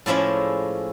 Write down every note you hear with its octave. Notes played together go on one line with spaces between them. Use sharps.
A2 F3 G#3 C#4 E4 D5 E5